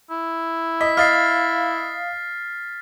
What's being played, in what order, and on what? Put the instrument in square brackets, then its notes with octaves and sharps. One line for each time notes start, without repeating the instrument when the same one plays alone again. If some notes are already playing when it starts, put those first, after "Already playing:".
[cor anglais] E4
[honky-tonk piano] D#5 [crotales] B6
[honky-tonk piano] D#5 F5 [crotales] F6 A6 C7